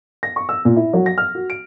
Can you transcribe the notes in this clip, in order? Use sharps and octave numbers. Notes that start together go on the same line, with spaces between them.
A#6
C#6
E6
A#2
E4
F#3
A#6
F6
F#4
D7